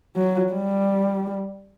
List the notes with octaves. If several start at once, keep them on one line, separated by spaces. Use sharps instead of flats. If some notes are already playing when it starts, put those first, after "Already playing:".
F#3
G3